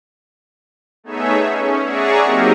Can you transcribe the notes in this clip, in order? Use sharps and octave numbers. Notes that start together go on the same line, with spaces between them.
A3 B3 D#4 G#4 C#5 E5
C#4
G#4 D5 E5 F#5 A#5 C#6
F#3 A#3 C4 D#4 G4 A#4